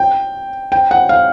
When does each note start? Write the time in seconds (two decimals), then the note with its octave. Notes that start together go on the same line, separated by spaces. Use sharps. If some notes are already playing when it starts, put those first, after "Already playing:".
Already playing: G5
0.72 G5
0.91 F#5
1.09 F5